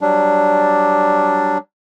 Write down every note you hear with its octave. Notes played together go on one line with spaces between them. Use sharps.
F#3 G3 D4